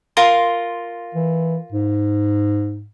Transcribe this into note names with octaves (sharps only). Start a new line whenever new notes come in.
F4 A#4 C6
E3
G#2